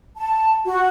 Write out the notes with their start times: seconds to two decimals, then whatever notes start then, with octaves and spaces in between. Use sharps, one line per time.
0.17 A5
0.65 F#4